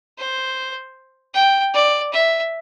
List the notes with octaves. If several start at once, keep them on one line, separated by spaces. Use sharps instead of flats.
C5
G5
D5
E5